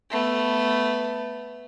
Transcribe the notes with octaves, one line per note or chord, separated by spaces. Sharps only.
A3 B3